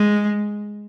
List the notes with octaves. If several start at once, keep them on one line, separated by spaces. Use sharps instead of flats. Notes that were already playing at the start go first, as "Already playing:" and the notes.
Already playing: G#3